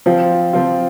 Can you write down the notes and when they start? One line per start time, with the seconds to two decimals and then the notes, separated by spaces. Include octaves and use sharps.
0.06 F3 C4 F4
0.53 F3 C4 F4